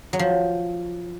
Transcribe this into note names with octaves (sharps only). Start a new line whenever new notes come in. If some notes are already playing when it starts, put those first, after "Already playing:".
F#3
F3